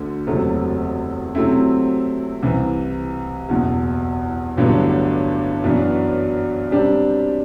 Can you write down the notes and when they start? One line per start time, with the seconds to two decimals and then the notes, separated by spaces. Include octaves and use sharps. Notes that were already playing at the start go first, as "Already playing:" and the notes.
Already playing: D2 D3 A3
0.27 F#1 E2 C3 F#3 A3
1.35 C3 F#3 A3 C4 E4
2.42 C2 C3 E3
3.49 F#1 E2 B2
4.57 A1 G2 D3 F#3 B3
5.64 F#2 E3 B3 D4 F#4
6.71 C3 G3 D4 G4